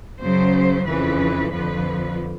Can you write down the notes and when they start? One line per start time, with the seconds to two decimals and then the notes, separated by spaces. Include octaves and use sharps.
0.20 F#2 C#3 F#3 C5
0.86 F2 C#3 E3 B4
1.52 F2 D3 F3 B4